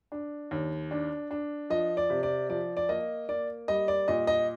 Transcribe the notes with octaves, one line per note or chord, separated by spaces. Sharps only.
D4
D#2
D4
D4
F3 D#5
D5
C3
D5
F3 D5
D5
A#3 D#5
A#3 D5
G3 D#5
D5
A#2 D#5
D#5